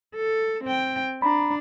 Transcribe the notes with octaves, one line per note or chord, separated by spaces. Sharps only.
A4
C4 G5
D4 A#5 B5